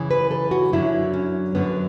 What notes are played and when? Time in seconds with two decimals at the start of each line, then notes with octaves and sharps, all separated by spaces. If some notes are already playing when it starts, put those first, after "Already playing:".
Already playing: F#2 C#3 E3
0.11 B4
0.31 A4
0.51 F#4
0.73 F#2 D3 F#3 E4
1.14 C#4
1.55 F#2 D3 F#3 B3